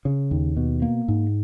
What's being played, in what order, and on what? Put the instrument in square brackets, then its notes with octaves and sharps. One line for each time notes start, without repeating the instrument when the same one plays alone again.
[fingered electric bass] C#3
D#2
B2
A#3
G#2